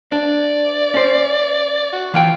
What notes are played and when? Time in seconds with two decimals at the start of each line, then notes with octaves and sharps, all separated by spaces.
0.12 D4 D5
0.94 C#4 C5
1.93 F#4
2.14 E3 F4 F5 G5